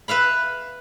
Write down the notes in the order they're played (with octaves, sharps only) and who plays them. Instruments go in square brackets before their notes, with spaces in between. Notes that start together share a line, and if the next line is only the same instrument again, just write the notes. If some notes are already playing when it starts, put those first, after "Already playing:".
[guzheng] B4 E5 F5 B5